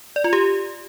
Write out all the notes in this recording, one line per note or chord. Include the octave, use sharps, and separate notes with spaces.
D5
F4
G4